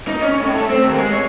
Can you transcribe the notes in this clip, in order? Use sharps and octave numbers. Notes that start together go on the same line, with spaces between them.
D#4
C#4
A2
A3
C4
D#2
G#3
C#5